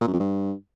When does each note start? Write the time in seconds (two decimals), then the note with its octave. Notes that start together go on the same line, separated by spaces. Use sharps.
0.01 A#2
0.07 F#2
0.13 F2
0.19 G2